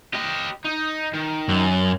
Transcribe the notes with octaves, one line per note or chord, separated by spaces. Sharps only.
G4 D#5
D#4
D#3
F#2